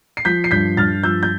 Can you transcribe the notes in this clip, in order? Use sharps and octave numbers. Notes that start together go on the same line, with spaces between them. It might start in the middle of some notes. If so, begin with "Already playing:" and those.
C7
F3 G6 B6
C7
G2 G6 B6
G2 F6 A6
F3 E6 G6
G6